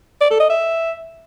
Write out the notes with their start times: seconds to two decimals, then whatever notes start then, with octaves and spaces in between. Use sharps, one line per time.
0.21 D5
0.31 A4
0.40 D#5
0.50 E5